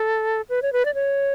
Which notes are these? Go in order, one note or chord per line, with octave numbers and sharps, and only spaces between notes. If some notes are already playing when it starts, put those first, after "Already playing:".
Already playing: A4
B4
C#5
B4
D5
C#5